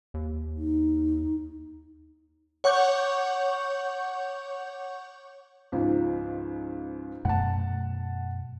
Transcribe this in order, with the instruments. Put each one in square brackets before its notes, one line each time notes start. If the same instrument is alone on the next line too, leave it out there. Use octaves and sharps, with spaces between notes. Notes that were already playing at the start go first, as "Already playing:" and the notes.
[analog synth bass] D#2
[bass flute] D#4
[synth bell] C#5 F#5 C#6 D6 G6
[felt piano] C#2 G#2 F3
[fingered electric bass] F#2 B2 A3 [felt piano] F#5 A5